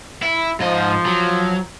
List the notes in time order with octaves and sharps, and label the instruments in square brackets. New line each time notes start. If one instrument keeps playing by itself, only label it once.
[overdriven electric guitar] E4
[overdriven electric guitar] G#2 D#5 [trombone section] F3
[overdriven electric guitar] F#3